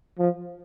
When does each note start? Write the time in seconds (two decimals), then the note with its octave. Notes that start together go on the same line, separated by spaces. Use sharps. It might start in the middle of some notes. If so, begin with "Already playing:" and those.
0.19 F3